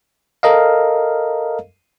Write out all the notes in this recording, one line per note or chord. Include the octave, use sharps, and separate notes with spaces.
A4 A#4 D#5 F5